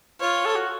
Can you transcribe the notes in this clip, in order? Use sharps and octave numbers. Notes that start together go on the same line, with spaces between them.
F4 C#5
A4
F#4